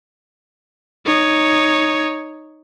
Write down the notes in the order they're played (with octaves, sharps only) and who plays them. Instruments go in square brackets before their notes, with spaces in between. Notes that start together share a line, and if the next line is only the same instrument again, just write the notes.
[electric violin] D#4 C#5